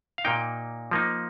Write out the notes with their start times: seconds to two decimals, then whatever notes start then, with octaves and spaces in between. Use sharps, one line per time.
0.18 F5
0.25 A#2 A#3 D#4 G5
0.91 F3 A#3 D#4